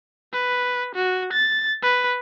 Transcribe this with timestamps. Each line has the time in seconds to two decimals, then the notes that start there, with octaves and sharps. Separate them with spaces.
0.33 B4
0.95 F#4
1.33 A6
1.83 B4